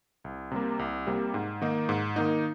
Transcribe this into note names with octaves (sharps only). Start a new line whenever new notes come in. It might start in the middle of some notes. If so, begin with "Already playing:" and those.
C2
C3 G3 A#3
C2
C3 G3 A#3
G#2
D#3 A#3 D#4
G#2
D#3 A#3 D#4